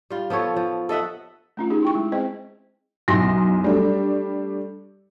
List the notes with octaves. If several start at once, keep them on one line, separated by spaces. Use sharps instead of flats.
G3 F4
F3 B3 A4 C#5
F3
A4 D#5 E5 F#5
A3 C#4 F4
D#4 G4 G#4
E4 G5 C#6
G#3
C4 G#4 C5 D#5 G5
B1 F#2 E4 C6 A#6
G3 A3 D4